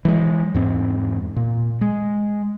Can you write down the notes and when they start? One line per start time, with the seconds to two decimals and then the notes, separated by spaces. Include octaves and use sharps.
0.05 E3 F#3 G#3
0.54 E2 G#2 C4
1.36 A#2
1.81 G#3